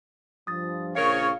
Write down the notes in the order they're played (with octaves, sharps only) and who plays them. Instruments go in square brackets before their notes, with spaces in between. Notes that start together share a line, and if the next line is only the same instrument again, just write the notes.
[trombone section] G2 F3 [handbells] D#6 A6
[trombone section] A#1 [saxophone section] C#3 A#4 [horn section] C#5 [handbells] F5 C#7